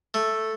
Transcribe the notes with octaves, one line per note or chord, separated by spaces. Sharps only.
A3